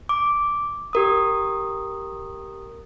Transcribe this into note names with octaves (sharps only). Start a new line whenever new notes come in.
D6
G4 A#4 D#6